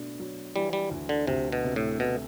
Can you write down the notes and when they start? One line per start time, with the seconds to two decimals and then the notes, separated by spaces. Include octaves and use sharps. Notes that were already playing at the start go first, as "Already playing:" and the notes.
Already playing: B2 A3 D4
0.20 F#3
0.55 E3 G3
0.73 G3
0.91 D2
1.09 D3
1.27 D2 C3
1.52 B2
1.64 C3
1.76 A2
2.00 B2 A3